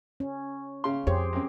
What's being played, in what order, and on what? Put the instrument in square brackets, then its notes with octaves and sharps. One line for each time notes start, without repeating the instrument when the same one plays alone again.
[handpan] C#4
[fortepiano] C#3 C6
[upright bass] F2 [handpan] G4 G#4 C5 [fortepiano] C#5
[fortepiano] F#2 C4